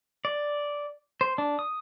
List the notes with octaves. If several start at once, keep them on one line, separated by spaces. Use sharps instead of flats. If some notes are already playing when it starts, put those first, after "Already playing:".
D5
C5
D4
D#6